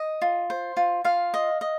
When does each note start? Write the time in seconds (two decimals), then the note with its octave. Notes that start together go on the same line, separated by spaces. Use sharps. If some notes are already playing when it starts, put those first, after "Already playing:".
Already playing: D#5
0.22 F4
0.50 C5
0.77 F4
1.04 F4 F5
1.34 D#5
1.61 D#5